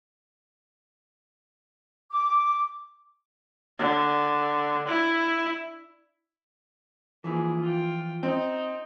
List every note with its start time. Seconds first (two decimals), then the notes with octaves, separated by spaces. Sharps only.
2.11 D6
3.79 D3
4.88 E4
7.24 E3 F3 A#3 E4 G#4
7.61 F4 G5
8.23 C4 D#4